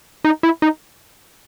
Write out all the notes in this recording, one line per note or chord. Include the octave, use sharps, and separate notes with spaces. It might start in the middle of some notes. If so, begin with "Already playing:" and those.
D#4
E4
D#4